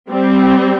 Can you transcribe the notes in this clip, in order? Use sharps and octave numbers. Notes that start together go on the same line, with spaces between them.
G3 C4